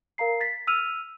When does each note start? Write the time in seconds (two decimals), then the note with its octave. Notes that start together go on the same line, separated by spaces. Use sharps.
0.18 A#4 F5 A#5 C7
0.41 A6 B6
0.67 E6 F6 D#7 F7